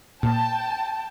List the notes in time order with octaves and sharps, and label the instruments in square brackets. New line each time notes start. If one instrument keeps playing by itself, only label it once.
[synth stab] A#2 [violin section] G5 A5